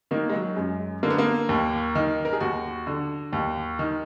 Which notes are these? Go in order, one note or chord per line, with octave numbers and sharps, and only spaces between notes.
D#3 A#3
G#3
F#3
F#2 G#3
D3 A#3
B3
A#3
D#2
D#3
A#4
G#4
D#2 F#4
D3
D#2
D#3